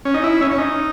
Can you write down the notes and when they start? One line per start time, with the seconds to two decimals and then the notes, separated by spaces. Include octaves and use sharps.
0.05 C#4
0.14 D#4
0.23 E4
0.41 C#4
0.51 C#4
0.58 D#4